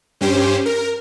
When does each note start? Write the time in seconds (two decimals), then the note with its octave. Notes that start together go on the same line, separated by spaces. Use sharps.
0.21 G2 C#4 G4 C5
0.66 A#4